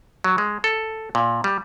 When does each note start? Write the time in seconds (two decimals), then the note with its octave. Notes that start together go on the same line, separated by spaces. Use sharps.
0.24 F#3
0.38 G#3
0.64 A4
1.15 A#2
1.44 G3